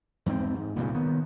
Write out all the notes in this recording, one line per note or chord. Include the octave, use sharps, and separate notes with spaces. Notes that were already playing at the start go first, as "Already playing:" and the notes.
E2 G#2 A3 C4
G#2
C2 G2 A#2 C#3
D#3 B3